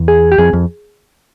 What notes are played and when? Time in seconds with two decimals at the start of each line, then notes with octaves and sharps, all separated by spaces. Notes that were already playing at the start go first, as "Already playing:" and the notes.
Already playing: E2
0.08 G#4
0.32 G4
0.38 F2 G#4
0.53 F2